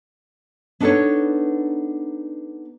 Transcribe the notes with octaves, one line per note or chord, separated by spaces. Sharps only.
B3 D4 D#4 A4 B4 C#5